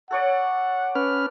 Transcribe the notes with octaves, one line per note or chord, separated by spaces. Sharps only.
A4 C#5 D5 F#5
C#4 B4 F6